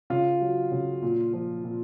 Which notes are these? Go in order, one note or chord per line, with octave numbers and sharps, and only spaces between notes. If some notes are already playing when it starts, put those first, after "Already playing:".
C#3 F4
F#3
C#3
A#2
F3
A#2